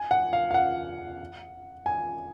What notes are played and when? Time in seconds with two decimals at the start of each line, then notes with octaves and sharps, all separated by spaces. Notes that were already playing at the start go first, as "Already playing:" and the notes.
Already playing: G#5
0.11 F#5
0.33 F5
0.51 F5
0.54 F#5
1.86 G#5